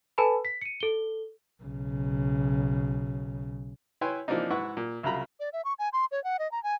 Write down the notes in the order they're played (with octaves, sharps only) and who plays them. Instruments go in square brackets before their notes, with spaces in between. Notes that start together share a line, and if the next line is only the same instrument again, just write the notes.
[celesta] A4 B4 G#5 A5 B5
B6
C#7 D#7
A4 G7
[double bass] B1 C#3
[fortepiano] E4 B4 C#5 G5 G#5 C6
E3 F3 A#3 C4 D4 D#4
G#2 E4 B4 F#5 C#6
A#2
C2 C#3 F#3 F4 A#5 B5
[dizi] D5
E5
C#6
G#5
C6
C#5
F#5
D#5
A#5
G#5